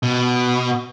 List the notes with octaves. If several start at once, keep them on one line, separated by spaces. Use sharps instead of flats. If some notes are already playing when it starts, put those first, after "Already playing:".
B2